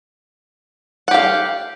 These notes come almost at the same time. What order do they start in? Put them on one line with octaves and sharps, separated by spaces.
F#5 G4 F5